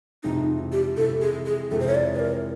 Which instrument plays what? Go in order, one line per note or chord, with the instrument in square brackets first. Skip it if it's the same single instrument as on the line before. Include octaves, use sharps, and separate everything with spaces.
[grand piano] F2 C3 E3 G#3 [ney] D#4
[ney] G4
[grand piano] F2 C3 E3 G#3 [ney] A4
[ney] G#4
G#4
[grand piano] F2 C3 E3 G#3 [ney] A4
[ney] C5
C#5
D5
B4
A#4